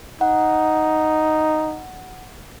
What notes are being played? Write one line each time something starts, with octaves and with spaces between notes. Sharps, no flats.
D#4 F#5